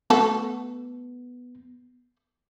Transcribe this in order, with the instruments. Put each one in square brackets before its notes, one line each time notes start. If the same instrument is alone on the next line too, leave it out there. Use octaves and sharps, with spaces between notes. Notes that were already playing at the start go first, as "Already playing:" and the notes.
[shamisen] A3 F#4 A4 [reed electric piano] B3